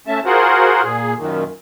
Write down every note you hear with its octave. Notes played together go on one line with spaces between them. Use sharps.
A3 C#4 E5 A5
F4 F#4 G#4 A#4 C5 F#5
A#2 G#4
F#2 A#2 D#3